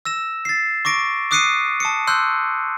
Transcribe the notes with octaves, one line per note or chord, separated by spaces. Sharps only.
E6 A#6 E7
A6 C7
C#6 D6 A#6 D7
D6 D#6 F#6 C7 C#7 D#7
A5 D#6 C#7
C6 E6 F#6 G6